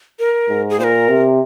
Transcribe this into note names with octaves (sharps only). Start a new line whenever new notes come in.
A#4
G#2
G#4
A#2 A#4 C5
C3